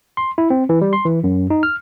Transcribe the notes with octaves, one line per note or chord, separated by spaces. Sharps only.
C6
E4
C4
E3
G3
C6
E3
F#2
D#4
F6